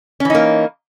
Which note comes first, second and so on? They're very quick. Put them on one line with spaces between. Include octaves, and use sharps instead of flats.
C#4 E3 D#4 A#3